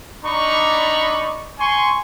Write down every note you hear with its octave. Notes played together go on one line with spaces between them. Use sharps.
D4 D#4 D5 A#5 B5 C#6
G#5 C6 C#6